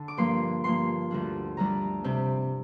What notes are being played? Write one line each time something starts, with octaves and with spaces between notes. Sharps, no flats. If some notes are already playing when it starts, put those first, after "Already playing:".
Already playing: D3 D4
D6
G2 F3 A#3 C6
G2 F3 A#3 C6
D2 D3 G3 D4
D2 D3 G3 D4 A#5
C3 G3 C4